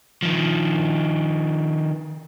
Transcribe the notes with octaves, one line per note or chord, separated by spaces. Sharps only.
D#3 F3